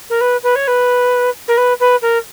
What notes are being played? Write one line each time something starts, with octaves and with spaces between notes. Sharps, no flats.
A#4
B4
B4
C#5
B4
A#4
B4
B4
A#4